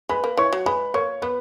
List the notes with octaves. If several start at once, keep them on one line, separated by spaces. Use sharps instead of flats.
G#3 B4 B5
A#3
E3 C#5 C#6
F#3
G#3 B4 B5
A#3 C#5 C#6
B3 B4 B5